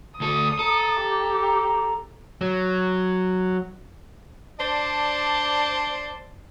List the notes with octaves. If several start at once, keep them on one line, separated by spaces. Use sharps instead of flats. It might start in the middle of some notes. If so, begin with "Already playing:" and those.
D2 A4 D#6
A4 A#5
G4 A#5
F#3
D4 C5 D5 A5